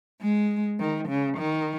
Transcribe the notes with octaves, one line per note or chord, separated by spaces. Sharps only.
G#3
D#3
C#3
D#3